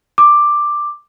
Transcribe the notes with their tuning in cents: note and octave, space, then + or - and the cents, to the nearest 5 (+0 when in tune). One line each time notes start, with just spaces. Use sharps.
D6 +10